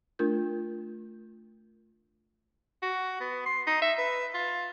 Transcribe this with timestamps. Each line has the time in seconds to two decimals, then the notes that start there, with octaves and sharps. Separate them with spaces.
0.19 A3 D4 F4 A#4 G6
2.83 F#4
3.20 B3
3.46 C6
3.67 D#4
3.82 E5
3.98 B4
4.34 F4